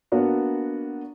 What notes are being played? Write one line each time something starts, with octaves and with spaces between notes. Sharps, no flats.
A#3 B3 D4 F#4